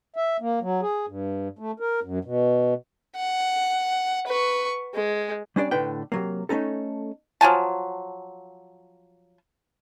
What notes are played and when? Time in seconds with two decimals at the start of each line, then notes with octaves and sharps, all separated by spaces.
0.16 E5
0.41 A#3
0.62 F#3
0.82 G#4
1.07 G2
1.59 A3
1.80 A#4
2.03 F#2
2.25 B2
3.16 F#5
4.27 B4 C#6
4.94 G#3
5.56 G3 C#4 D4 D5
5.71 A2 D3 B4 G5
6.12 C3 F#3 A#3
6.49 A3 C#4 D#4 A4
7.41 F3 F#3 G#5 A5